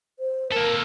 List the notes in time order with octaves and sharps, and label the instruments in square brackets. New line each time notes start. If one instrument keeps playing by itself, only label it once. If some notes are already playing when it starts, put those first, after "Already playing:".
[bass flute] C5
[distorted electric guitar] A#3 A4 [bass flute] A#4